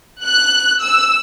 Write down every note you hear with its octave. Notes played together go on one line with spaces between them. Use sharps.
F#6
E6